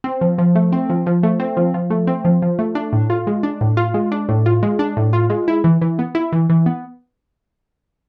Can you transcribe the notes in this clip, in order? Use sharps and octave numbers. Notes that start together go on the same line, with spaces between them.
C4
F3
F3
A3
C4
F3
F3
A3
C4
F3
F3
A3
C4
F3
F3
A3
D4
A2
F4
G#3
D4
A2
F4
G#3
D4
A2
F4
G#3
D4
A2
F4
G#3
E4
E3
E3
B3
E4
E3
E3
B3